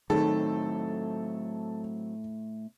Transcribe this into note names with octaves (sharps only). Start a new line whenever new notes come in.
A2 D#3 F#3 A3 C4 A4